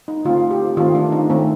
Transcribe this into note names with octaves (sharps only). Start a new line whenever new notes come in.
D#4
D3 A3 C4 F4
G4
D#3 A3 C4 F4
D4
D#4
D#3 A3 C4